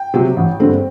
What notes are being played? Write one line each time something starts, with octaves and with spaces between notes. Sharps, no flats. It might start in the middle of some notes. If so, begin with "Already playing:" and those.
Already playing: G5
C3 F#3
A1
G2 D3 A3 C4